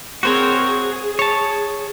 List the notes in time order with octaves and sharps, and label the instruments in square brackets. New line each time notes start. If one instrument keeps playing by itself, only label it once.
[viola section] C4 G#4 A#4 [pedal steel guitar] F#4 C5 C#5
[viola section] G#4
[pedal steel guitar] C#5 A5